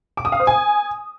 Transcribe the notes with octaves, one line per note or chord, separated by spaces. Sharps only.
D6
D#6
F5
C5
G#5